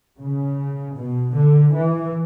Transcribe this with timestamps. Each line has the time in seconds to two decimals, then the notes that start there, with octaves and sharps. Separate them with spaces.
0.20 C#3
0.97 B2
1.36 D3
1.75 E3